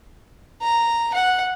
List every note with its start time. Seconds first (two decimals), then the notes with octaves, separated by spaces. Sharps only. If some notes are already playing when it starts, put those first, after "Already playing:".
0.62 A#5
1.14 F#5